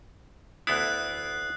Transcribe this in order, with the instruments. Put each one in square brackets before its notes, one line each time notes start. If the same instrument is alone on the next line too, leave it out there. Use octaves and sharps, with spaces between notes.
[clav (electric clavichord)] D2 B3 E4 [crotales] D#6 F#6 C7